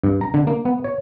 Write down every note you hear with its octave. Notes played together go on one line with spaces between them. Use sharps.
G2
A#5
D3
A#3
B3
C#5